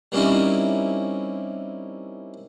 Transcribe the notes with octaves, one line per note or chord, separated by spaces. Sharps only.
G3 A#3 C4 C#4 D#4 E4